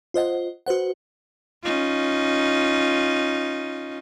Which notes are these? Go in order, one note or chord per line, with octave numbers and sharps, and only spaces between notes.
F4 C5 D#5 F#5
F#4 B4 C5 F#5
C#4 D#4 F4